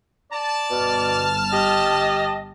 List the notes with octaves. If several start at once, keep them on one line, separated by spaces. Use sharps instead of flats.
D5 A5
G1 B2 F6
G4 D#5